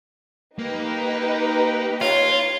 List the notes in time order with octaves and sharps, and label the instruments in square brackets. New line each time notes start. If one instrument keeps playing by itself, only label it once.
[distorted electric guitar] A#3 [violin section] D#4 G4 B4
[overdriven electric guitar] F4 [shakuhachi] C#5